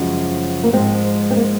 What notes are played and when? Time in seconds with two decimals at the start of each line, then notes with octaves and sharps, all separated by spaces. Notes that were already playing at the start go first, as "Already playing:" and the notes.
Already playing: F#2 C#3 F3 G#3
0.63 A#3
0.73 G#2 F3 G#3 C4
1.31 C4
1.36 A#3